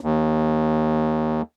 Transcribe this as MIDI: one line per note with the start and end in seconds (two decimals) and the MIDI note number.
0.01 1.42 39